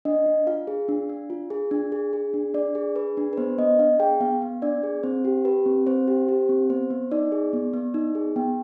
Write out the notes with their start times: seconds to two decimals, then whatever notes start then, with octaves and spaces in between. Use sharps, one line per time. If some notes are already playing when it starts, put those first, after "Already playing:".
0.05 D4 D#5
0.26 D4
0.47 F4 F5
0.67 G#4
0.88 D4
1.09 D4
1.30 F4
1.50 G#4
1.71 D4
1.92 G#4
2.13 G#4
2.34 D4
2.54 D4 D5
2.75 G#4
2.96 G#4 B4
3.17 D4
3.33 B4
3.37 B3 C5
3.58 B3 D#5
3.79 D4 F5
4.00 G#4 G5
4.21 B3 F5
4.42 B3
4.62 D4 D5
4.83 G#4
5.03 C4 C5
5.25 G4
5.45 G4 B4
5.66 C4
5.87 C4 C5
6.07 G4
6.29 G4
6.49 C4
6.70 B3 C5
6.90 B3
7.11 D#4 D5
7.32 G#4
7.53 B3
7.74 B3
7.94 D#4
8.15 G#4
8.36 B3 G5